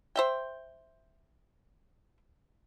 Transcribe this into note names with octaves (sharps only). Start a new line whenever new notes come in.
C5 E5 G5